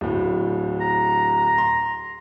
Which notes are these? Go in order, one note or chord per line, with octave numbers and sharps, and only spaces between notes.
D1 A2
A#5
C6